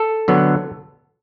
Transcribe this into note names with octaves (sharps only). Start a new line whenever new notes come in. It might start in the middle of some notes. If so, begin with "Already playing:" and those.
Already playing: A4
D3 F#3 B3